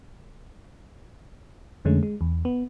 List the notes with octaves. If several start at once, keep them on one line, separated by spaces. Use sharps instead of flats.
F2 D3 G#3 A3 C#4
G#3
E2
B3